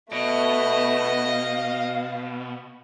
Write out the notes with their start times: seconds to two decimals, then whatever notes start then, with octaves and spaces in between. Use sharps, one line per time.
0.12 B2 A3 B3 D#5
1.30 F5